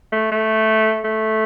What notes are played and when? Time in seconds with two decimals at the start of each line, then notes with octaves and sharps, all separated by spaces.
0.12 A3
0.31 A3
1.04 A3